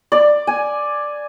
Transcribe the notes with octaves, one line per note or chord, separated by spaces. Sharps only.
D5
G#5